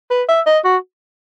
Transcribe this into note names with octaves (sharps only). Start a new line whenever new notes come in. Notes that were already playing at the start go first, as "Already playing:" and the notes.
B4
E5
D#5
F#4